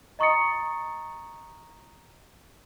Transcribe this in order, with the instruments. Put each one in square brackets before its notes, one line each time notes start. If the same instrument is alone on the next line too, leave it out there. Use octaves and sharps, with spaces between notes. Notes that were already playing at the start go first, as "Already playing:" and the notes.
[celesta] D#5 A#5 C#6 D#6 A6 C#7